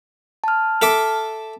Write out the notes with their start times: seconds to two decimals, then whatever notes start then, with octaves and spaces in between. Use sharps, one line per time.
0.44 A5 F6
0.82 A4 E5 D6